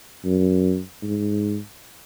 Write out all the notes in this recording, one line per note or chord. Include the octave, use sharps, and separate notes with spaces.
F#2
G#2